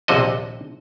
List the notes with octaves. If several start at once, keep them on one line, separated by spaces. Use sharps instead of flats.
A#1 D#2 C3 F#4 D#5